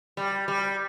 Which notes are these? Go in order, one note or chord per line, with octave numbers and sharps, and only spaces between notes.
G3
G3